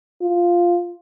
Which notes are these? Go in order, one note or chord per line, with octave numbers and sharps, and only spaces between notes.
F4